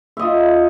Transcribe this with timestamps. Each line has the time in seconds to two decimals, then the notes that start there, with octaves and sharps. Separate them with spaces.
0.17 E5
0.19 D#5
0.22 F4